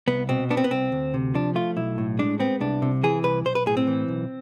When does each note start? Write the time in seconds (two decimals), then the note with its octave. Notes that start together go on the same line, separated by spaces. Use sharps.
0.08 C2 B3
0.29 B2 C4
0.50 B3 D4
0.57 C4
0.64 B3
0.71 C2 C4
0.92 D2
1.14 C3
1.34 F3 D4
1.55 A3 F4
1.77 B1 E4
1.98 A2
2.19 G#3 D4
2.40 B3 C4
2.60 C2 D4
2.82 C3
3.03 E3 G#4
3.24 C2 B4
3.45 B1 C5
3.55 B4
3.66 A2 G#4
3.77 C4
3.87 E3
4.08 B1